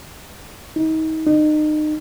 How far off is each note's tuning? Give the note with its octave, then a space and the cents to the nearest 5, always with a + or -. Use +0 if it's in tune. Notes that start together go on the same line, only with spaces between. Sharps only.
D#4 +30
D#4 -35